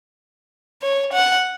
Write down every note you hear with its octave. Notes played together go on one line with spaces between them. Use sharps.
C#5
F#5